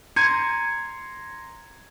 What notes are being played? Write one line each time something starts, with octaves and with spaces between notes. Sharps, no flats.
A#5 C6 G#6 C#7 D#7